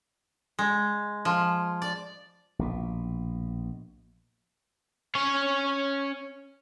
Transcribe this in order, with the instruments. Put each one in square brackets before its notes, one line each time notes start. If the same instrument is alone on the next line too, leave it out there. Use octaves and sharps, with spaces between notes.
[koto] G#3
F3
D5
[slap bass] A#1 B2
[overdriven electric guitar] C#4 C#5